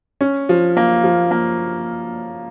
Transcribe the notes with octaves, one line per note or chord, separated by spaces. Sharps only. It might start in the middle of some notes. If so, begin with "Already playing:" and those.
C#4
F3
A#3
F3
A#3